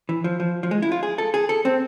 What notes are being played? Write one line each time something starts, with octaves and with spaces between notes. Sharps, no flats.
E3
F3
F3
F3
G#3
E4
F4
G#4
A4
G#4
A4
C4